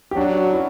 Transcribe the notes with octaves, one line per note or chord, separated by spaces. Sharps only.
G4
F#3 D4 F#4
C#4 E4